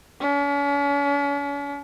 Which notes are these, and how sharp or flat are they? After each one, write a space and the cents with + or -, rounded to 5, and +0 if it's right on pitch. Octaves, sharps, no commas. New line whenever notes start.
C#4 +40